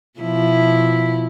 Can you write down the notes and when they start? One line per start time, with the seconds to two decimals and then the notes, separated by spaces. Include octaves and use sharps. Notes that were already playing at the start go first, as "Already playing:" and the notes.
0.20 B2 F3 E4